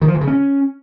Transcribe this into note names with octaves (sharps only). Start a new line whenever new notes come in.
D#3
F3
E3
C#3
C#4